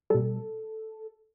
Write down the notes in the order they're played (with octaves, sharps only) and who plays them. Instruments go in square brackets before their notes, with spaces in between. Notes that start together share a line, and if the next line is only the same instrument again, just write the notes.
[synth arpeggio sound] B2 G3 A4